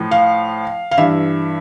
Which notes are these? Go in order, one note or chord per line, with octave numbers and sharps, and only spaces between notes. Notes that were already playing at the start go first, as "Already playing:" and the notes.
Already playing: A2 F3
F5
F5
G2 E3 E5